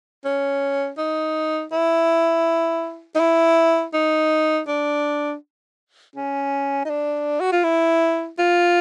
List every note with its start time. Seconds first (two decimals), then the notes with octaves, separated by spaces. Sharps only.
0.25 C#4
0.98 D#4
1.72 E4
3.16 D#4
3.20 E4
3.94 D#4
4.68 D4
6.16 C#4
6.85 D#4
6.90 D4
7.40 F#4
7.52 F4
7.64 E4
8.39 F4